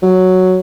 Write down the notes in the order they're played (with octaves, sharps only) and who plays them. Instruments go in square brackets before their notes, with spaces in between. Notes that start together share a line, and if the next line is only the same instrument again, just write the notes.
[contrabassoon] F#3